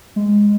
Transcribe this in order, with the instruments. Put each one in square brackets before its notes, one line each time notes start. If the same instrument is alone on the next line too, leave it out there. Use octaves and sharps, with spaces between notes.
[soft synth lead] G#3